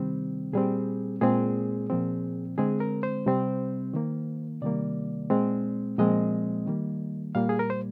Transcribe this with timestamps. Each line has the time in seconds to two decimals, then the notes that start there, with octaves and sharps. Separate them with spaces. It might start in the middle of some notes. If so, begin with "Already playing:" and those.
Already playing: C3 D#3 G3 C4
0.53 A#2 G3 C4 G#4
1.21 A#2 G#3 C4 G#4
1.89 A#2 F3 C4
2.58 D3 G#3 C4 G#4
2.80 A#4
3.03 C5
3.26 C3 G3 C4
3.94 D#3 A#3
4.62 C3 D#3 G3 A#3 D5
5.30 A#2 G#3 C4
5.99 A#2 F3 G#3 C4 D#5
6.66 D#3 G3 A#3
7.35 A#2 G3 A#3 F5
7.49 G#4
7.59 A#4
7.70 C5